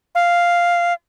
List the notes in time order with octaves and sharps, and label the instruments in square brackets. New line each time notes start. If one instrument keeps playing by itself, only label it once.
[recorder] F5